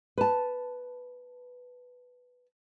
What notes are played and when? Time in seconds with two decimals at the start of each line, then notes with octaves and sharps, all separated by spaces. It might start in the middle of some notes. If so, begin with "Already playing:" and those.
0.18 B4 A5